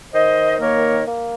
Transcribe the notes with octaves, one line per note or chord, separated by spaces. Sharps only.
D#3 C5 D#5
A#3 A#4 C#5
A#3